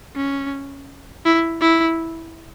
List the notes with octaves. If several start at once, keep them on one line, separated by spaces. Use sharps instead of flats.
C#4
E4
E4